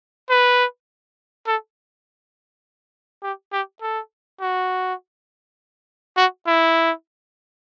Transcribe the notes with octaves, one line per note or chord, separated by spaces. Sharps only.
B4
A4
G4
G4
A4
F#4
F#4
E4